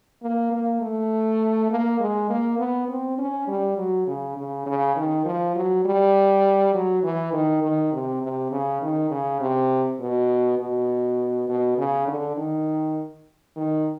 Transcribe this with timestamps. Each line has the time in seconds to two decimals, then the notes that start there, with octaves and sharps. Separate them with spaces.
0.22 A#3
0.52 A#3
0.81 A3
1.70 A#3
2.00 G#3
2.29 A#3
2.59 B3
2.89 C4
3.18 C#4
3.47 G3
3.77 F#3
4.07 C#3
4.36 C#3
4.66 C#3
4.96 D#3
5.25 F3
5.55 F#3
5.85 G3
6.74 F#3
7.03 E3
7.33 D#3
7.63 D#3
7.93 C3
8.22 C3
8.51 C#3
8.81 D#3
9.11 C#3
9.40 C3
10.00 B2
10.59 B2
11.49 B2
11.78 C#3
12.07 D3
12.37 D#3
13.56 D#3